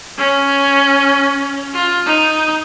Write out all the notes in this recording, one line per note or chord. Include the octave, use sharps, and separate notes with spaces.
C#4
F4
D#4